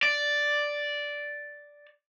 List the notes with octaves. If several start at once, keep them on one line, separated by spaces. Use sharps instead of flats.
D5